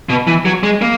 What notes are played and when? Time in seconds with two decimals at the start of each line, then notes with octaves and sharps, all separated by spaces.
0.09 B2
0.27 E3
0.45 F#3
0.63 G#3
0.82 A#3